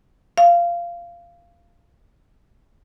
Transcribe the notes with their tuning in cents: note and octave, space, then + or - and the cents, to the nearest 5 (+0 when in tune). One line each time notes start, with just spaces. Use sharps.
F5 -15